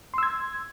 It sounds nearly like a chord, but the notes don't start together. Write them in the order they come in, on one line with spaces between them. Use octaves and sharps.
C6 E6 G#6